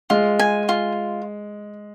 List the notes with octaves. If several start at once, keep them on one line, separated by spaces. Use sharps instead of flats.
G#3 F4
G#5
F4